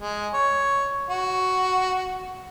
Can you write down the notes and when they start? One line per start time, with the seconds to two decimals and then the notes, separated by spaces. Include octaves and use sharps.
0.01 G#3
0.34 C#5
1.10 F#4